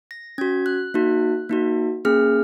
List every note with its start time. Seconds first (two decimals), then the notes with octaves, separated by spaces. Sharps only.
0.11 A#6
0.38 C#4 F#4 G#6
0.66 F#6
0.94 A#3 D#4 F#4
1.49 A#3 D#4 F#4
2.05 A#3 C#4 G#4 F6